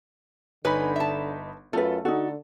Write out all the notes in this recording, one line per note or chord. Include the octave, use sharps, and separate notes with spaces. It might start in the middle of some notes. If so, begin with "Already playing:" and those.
G1 D3 D#4 B4 C#5 G#5 B5
E5 A5
F#2 A3 F4 A4 B4
D3 D#4 F#4 A4